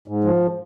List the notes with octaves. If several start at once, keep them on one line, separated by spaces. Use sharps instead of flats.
G#2
F3